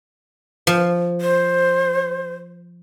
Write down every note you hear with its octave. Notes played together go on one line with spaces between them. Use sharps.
F3
C5